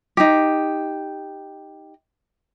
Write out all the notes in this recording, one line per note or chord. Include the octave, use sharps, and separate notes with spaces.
D#4 G4